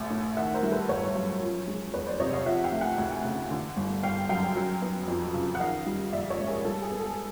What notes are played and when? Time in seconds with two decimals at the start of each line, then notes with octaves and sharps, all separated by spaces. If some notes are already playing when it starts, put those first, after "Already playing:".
Already playing: A1 A3
0.10 A2
0.37 D#3 E5 F#5
0.54 A#4 C5
0.63 G3
0.72 A4 B4
0.89 G1 B4 C#5
1.15 F#2
1.41 F3
1.68 G#3
1.94 E2 B4 C#5
2.07 C5 D5
2.20 C3 C#5 D#5
2.33 D#5 F5
2.46 F3 E5 F#5
2.64 F5 G5
2.72 A3
2.81 F#5 G#5
2.98 D2
3.25 C#3
3.51 D3
3.77 G1
4.03 G1 F5 G5
4.29 F#2 F5 G5
4.56 F#3
4.82 B3
5.08 F2
5.34 C#3
5.55 F#5
5.60 D#3 D#5 F5
5.86 G3
6.12 A#1 D5 E5
6.30 C#5 D#5
6.39 G#2
6.47 G#4 A#4
6.65 G3 A4
6.82 G#4
6.91 B3
7.00 A4